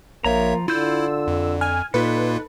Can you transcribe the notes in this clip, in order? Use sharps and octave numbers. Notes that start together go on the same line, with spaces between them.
A#1 F3 A#3 C#5 E5 A#5
D3 E4 F4 E6 G6
F2
G#5 F6
A#2 A#3 D#4 F4 A4 B4